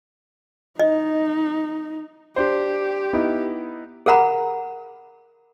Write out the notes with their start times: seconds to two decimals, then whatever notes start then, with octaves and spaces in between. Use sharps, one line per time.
0.80 D#4 D#5
2.36 D4 G4 C5
3.13 B3 D#4 E4
4.06 G#4 A#4 F#5 A#5 B5